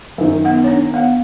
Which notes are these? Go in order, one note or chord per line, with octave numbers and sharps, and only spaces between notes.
F#2 D#3
B3 F#5
D4 C#5
B3 F5 F#5